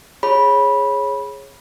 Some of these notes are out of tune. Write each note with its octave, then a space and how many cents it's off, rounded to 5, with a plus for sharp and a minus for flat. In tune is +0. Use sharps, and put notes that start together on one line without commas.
G#4 +0 C#5 -20 B5 -15